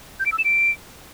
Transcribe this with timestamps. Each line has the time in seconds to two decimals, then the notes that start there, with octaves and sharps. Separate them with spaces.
0.20 G6
0.26 D7
0.32 E6
0.38 E7
0.45 D7